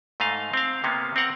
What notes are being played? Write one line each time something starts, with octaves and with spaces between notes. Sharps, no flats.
G#2 A3 D#5 F5
C4 F5
C3 A#3 B3 C#4
C4 A#4 F#5 A#5